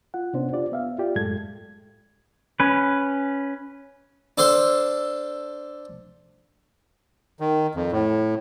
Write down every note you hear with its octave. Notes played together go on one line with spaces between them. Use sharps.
F4 F#5
C3 B3 C#4 D4 C5
D4 F4 G4 D5
B3 E5 F5
F4 G4 D5
F#2 A2 G#3 A4 G#6
C#4 B4
D4 A4 C5 F5 C6
D#3
F2
A2